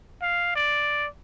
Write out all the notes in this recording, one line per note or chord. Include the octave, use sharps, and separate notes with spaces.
F5
D5